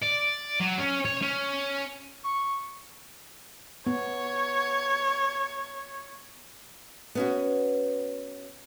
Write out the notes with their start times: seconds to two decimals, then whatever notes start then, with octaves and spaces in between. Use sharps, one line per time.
0.02 D5
0.60 F#3
0.78 C#4
1.05 C#5
1.22 C#4
2.24 C#6
3.87 B3 C#5
7.15 B3 C#4 F#4